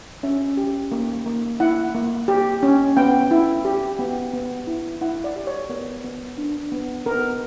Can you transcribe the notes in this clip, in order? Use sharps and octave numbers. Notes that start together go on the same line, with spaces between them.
C#4 E5
G4
A#3
A#3
E4 F#5
A#3
G4
C#4
B3 G5
E4
G4
B3
B3
E4
E4 F#5
D5
G4
C#5
B3 A#4
B3
D4
B3
B3 A#4